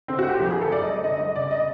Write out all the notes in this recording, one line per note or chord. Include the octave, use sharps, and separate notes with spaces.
D3 C4
F#4
D2
G4
F3 G4
G#4
D2
A4
F#2 D5
D#5
G1
D3 D#5
G1 D#5
C#3 D5
D#5